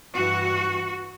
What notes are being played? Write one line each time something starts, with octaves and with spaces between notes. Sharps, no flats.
G2 E3 F#4